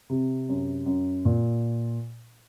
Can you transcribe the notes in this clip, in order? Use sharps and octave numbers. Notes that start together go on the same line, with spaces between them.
C3
F#2
F#2
A#2